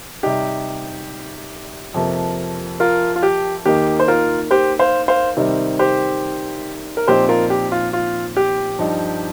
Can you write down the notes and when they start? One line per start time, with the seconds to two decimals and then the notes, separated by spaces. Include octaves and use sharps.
0.23 C3 G3 D#4 G4
1.94 F2 C3 F3 A#3
2.80 F4 A#4
3.16 F4
3.23 G4
3.66 D#2 D#3 A#3 D#4 G4
4.00 C5
4.08 F4 A#4
4.51 G4 C5
4.79 C5 F5
5.08 C5 F5
5.37 C3 D#3 G3 C4 D#4
5.79 G4 C5
6.97 A#4
7.08 A#2 F3 C4 D#4 G4 C5
7.29 F4 A#4
7.50 G4
7.72 F4
7.93 F4
8.37 G4
8.79 G2 F3 D#4